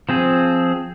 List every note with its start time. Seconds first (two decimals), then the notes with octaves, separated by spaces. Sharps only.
0.09 F3 C4 G#4